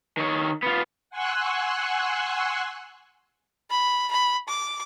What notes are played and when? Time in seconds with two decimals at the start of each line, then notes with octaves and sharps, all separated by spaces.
0.17 D#3 C#5
0.63 B3 F4
1.10 F#5 G#5 C6 C#6 E6 F#6
3.71 B5
4.11 B5
4.48 D6